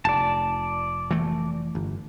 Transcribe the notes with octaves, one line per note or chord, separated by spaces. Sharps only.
F1 D5 A5
E3 A3
G1